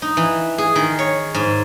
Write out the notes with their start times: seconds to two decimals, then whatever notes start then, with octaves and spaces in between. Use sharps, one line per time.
0.02 D#4
0.17 E3
0.58 G#4
0.76 D#3
0.99 C#5
1.34 G#2